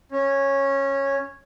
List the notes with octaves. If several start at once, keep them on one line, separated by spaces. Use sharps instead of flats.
C#4